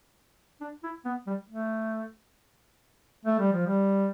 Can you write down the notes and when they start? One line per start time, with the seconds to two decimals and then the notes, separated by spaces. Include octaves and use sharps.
0.61 D4
0.84 E4
1.05 B3
1.27 G3
1.50 A3
3.25 A3
3.39 G3
3.53 F3
3.66 G3